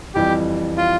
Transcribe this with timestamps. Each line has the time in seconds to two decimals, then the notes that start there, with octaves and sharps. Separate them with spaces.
0.15 F2 E3 G3 G4
0.77 F4